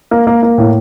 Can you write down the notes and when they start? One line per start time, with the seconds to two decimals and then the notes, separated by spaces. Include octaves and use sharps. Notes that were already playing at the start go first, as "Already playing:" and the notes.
0.11 A#3
0.27 A#3
0.43 A#3
0.58 A2